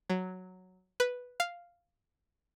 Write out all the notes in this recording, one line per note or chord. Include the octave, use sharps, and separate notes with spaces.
F#3
B4
F5